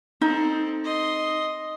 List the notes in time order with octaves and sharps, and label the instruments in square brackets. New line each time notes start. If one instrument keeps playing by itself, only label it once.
[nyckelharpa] C4 A4 [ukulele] D#4
[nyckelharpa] D#5 C6